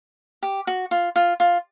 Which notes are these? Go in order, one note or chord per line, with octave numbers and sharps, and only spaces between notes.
G4
F#4
F4
F4
F4